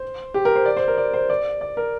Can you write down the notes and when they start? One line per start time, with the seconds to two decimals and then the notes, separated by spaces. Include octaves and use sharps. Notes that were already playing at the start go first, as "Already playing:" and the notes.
Already playing: C5
0.34 G4
0.45 A#4
0.56 C5
0.66 D5
0.77 C5
0.88 A#4
0.98 D5
1.13 C5
1.30 D5
1.61 D5
1.77 A#4